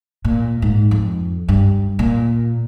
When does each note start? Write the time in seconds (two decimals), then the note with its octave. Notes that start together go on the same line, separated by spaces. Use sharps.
0.25 A#2
0.62 G#2
0.91 F2
1.49 G2
1.99 A#2